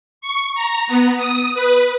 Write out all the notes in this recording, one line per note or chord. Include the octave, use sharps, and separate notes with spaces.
C#6
A#5
B3
D#6
B4